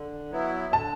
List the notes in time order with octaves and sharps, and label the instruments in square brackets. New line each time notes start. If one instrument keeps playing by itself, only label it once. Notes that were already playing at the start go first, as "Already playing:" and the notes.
Already playing: [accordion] D3
F#3 B3 E4
[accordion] D3 [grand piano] A5